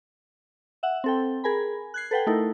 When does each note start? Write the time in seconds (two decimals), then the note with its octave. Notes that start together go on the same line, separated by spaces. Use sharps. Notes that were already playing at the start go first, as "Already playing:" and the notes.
0.83 E5 F#5
1.04 C4 A4 G5
1.44 G#4 A#4 G#5 B5
1.94 F#6 G#6 C7
2.11 A4 B4 F#5 G5
2.27 A3 D#4 E4 A4 A#4